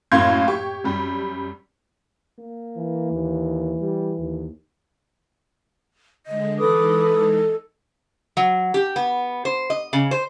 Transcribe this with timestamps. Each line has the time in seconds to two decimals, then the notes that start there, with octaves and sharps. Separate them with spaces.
0.12 F#2 A2 A#3 F5 C6 G#6
0.48 G4 C#6
0.84 F#2 G3
2.39 A#3
2.77 E3
3.12 D#2
3.80 G3
4.19 D#2
6.26 D3 G#3 D#5
6.58 E3 G#3 D#4 A4 B4 D6 D#6
8.37 F#3
8.74 G4
8.96 B3
9.45 C5
9.70 D#5
9.93 C#3
10.11 C5